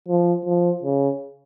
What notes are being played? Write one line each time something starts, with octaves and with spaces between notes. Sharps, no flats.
F3
F3
C#3